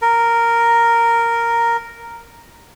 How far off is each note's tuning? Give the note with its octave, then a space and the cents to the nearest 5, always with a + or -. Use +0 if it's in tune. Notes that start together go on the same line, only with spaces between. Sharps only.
A#4 -5